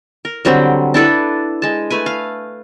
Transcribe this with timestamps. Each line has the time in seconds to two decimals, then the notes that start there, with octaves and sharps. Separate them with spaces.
0.25 A#4
0.45 D3 F#3 G3 C4
0.94 D4 E4 A4 B4
1.62 G#3 A5
1.90 A3 B4 G#5
2.06 F5